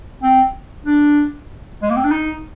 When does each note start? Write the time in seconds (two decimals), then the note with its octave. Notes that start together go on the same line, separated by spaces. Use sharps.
0.23 C4
0.86 D4
1.82 G#3
1.90 A#3
1.96 C4
2.04 D4
2.11 D#4